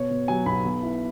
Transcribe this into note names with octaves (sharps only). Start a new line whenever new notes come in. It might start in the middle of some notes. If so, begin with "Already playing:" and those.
Already playing: B2 C#5
B2
F#3 G#5
B1 B5
B2
E4